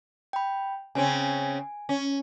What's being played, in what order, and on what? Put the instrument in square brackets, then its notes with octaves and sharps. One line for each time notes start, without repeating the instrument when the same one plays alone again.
[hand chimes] G5 B5
[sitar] C#3 C4 C#4 [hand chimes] G#5
[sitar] C#4